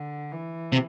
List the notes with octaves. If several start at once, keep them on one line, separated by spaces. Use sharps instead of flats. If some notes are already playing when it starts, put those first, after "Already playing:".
Already playing: D3
E3
C3